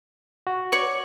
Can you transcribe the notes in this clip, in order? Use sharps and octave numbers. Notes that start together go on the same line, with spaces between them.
F#4
C#5 D5 C#6